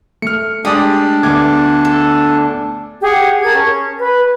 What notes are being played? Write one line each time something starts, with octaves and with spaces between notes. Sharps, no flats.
A3 F6 C#7
G#3 D4 G4 D5 D#6
D2 A3 B3 D6 G#6
A4
G4 G#4 F#5
A#4 A5 G#6
C#4
B4